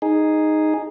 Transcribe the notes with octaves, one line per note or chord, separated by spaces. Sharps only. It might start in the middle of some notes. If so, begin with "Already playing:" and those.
D#4 G#4